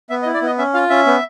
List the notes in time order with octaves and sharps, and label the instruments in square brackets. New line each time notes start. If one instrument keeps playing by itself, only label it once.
[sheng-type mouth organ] B3 E5
D#5
E4
D5
B3 D#5
C#4 E5
F4 F5
C#4 E5
B3